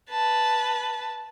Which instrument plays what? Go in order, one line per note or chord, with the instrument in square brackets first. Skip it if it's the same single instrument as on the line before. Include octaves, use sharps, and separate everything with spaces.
[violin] B4 A5